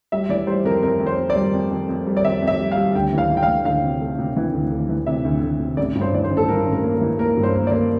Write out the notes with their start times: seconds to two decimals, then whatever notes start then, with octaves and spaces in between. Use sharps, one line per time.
0.12 G3 E5
0.29 E3 D5
0.47 G3 C5
0.65 F2 A#4
0.82 F2 A#4
1.00 F2
1.06 C5
1.18 F2
1.30 D5
1.36 G3
1.54 F2
1.71 F2
1.89 F2
2.07 G3
2.17 D5
2.25 F2 E5
2.42 F2
2.47 E5
2.60 G3
2.71 F5
2.77 G3
2.95 D2 G5
3.13 E3
3.18 F5
3.30 E3
3.37 G5
3.43 F5
3.48 E3
3.65 D2 F5
3.84 C3
4.01 A3
4.19 C3
4.36 E3
4.53 D2
4.71 D2
4.89 E3
5.07 C3 E5
5.25 D2
5.43 D2
5.60 C3
5.77 A1 D5
5.95 G2
6.01 C5
6.14 E3 D5
6.24 C5
6.31 A1
6.37 A4
6.48 G2 A#4
6.66 A1
6.72 A#4
6.84 A#3
6.95 A#4
7.01 E3
7.19 A#3 A#4
7.37 G2
7.43 C5
7.54 A#3
7.67 A#3 D5